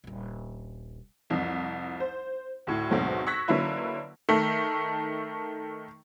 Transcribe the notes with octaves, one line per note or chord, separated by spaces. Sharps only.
D#1 A#1
C2 F2
C5
D2 A2
D2 G#2 B2 F#3 A3 C4
C#6 E6 F#6 G#6 A#6 B6
D3 F#3 A#3 C#4 E4 B4
D#3 A3